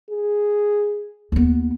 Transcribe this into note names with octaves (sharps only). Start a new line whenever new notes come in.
G#4
D#2 B3